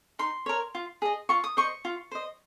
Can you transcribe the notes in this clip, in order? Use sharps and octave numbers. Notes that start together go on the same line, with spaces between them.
D#4 C6
A#4 C#5
F4
G#4 D#5
F4 C#6
D#6
C5 D#5 C#6
F4
C5 D#5